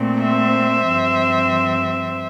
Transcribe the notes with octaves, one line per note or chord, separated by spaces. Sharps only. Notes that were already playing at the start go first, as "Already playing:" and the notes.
Already playing: A#2 A3 C4
C5 E5
G2 F3 C4